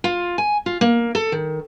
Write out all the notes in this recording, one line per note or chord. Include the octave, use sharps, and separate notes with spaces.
F4
G#5
F4
A#3
A4
D#3